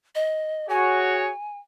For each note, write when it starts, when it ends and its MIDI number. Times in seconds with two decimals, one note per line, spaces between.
0.15 0.67 75
0.69 1.29 66
0.69 1.29 68
0.69 1.29 73
0.69 1.58 80